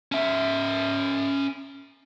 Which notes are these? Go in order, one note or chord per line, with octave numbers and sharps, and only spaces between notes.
C#4 E5